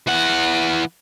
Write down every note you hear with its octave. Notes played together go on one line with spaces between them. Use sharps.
E3 F#5